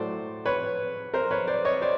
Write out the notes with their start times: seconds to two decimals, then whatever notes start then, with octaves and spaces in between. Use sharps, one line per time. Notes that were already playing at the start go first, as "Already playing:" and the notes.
Already playing: A2 F#3 A3 C5 D5
0.46 B4 C#5
1.14 A#4 C5
1.31 B4 C#5
1.48 C5 D5
1.65 C#5 D#5
1.82 C5 D5